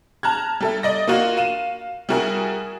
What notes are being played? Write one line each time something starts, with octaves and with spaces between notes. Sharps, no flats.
A5 A#5 F6 F#6 G#6
G3 A4 E5
D5 D#5 A#6
A#3 F4 F#4
F5 D#7 E7
G3 E4 F#4 G#4 A#4